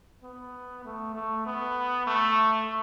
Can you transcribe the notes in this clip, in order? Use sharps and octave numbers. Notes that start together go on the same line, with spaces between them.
B3
A3
A3
B3
A3